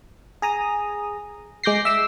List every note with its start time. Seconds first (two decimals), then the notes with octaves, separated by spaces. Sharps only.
0.42 G#4 A#5 D#6
1.64 G#3 D6 G6 A#6 C7
1.85 E5 D6 E6 C7